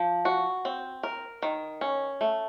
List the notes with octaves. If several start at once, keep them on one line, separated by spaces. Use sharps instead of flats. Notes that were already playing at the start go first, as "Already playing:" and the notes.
Already playing: F3
F#4
C4
A#4
D#3
C#4
A3